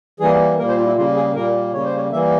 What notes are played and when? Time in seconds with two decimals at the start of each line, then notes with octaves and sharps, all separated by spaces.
0.20 E3 G3 A#3 G#4
0.58 A#2 G3 A#3 A#4
0.68 C5
0.77 F4
0.86 E4
0.96 C#3 G3 A#3 F4
1.16 G#4
1.34 A#2 G3 A#3 A#4
1.73 C#3 G3 A#3 C#5
1.85 C5
1.96 C#5
2.12 E3 G3 A#3 E5